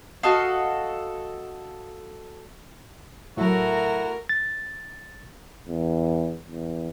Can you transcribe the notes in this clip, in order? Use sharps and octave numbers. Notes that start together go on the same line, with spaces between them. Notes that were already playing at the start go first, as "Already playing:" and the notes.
F#4 A4 D#5 F5
A2 F#3 A3 E4 F#4 A#4
A6
E2
E2